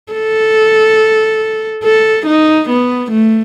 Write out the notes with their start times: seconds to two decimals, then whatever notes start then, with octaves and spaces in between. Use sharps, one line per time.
0.13 A4
1.84 A4
2.26 D#4
2.69 B3
3.11 A3